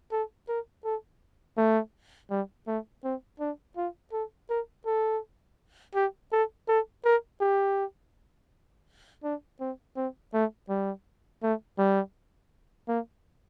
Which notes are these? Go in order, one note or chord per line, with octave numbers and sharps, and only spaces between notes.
A4
A#4
A4
A3
G3
A3
C4
D4
F4
A4
A#4
A4
G4
A4
A4
A#4
G4
D4
C4
C4
A3
G3
A3
G3
A#3